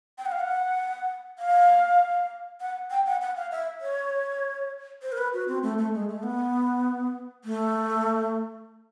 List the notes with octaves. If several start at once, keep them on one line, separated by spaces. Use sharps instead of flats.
G5
F#5
F5
F#5
F5
F#5
G5
F#5
F#5
F5
E5
C#5
C5
A#4
B4
F#4
C4
A3
A3
G#3
A3
B3
A3